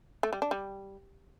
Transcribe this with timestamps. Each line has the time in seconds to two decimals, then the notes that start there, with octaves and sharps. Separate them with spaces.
0.23 A3
0.33 G3
0.42 D4
0.51 G3